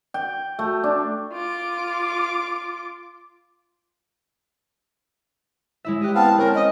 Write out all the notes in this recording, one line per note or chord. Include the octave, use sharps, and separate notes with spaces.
G5
A3
D4
F4 D6
G#3 E4 E5
G4 D#5 F#6
B3 C4 F5 A5
C4 C#4 A#4
D#5 B5 D#6